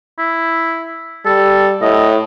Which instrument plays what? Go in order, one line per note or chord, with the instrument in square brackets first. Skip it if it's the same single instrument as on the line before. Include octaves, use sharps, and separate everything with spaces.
[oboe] E4
[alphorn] G3 [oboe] A4
[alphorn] A2 [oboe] D#5